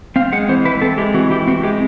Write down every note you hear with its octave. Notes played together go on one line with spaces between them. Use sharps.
C4 F5
G#3 F#5
E3 C5
E4 B4
C4 A4
G#3 G4
E3 F#4
E4 G4
C4 F#4
G#3 G4